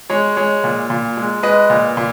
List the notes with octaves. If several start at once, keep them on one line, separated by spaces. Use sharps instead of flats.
G#3 C#5
G#3 C#5
A#2
A#2
G#3
G#3 B4 D#5
A#2
A#2